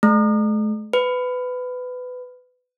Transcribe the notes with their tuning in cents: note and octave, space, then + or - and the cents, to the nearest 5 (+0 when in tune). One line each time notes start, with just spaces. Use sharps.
A3 -45
B4 +20